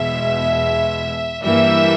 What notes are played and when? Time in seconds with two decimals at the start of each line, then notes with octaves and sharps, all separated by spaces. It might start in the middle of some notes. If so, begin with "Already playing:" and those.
Already playing: E2 B2 G#3 E5
1.43 G2 E3 G3 A#3 E5